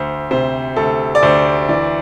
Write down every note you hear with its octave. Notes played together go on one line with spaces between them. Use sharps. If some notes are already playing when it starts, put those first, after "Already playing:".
Already playing: D2 C5
C3 C5
D2 A4
D5
D2 C5
E3 D5